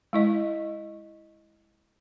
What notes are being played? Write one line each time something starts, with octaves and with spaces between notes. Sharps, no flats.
G#3 E4 D#5